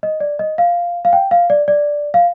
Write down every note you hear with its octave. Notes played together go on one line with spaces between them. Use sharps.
D#5
D5
D#5
F5
F5
G5
F5
D5
D5
F5